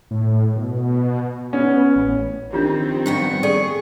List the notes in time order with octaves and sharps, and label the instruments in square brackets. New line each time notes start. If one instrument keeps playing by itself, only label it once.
[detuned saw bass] A2
B2
[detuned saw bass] B3 [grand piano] C#4
[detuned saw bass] A1
[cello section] D#3 F3 C4 [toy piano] D4 F4 G4
[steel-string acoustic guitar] G2 B3 G5 [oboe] C#6
[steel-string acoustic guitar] G#4 [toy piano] A4 D5